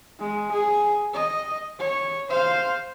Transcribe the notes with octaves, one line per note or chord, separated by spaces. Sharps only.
G#3
G#4
D#5
C#5
C5 F5